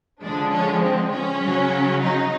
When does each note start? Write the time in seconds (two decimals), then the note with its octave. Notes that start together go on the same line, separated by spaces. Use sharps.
0.22 D3 F3 G#3 D4
0.52 C#4
0.82 C4
1.11 C#4
1.42 C#3 F#3
2.01 D#4